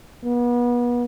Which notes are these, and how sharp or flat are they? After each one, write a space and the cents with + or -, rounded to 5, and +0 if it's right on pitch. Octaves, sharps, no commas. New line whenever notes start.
B3 -35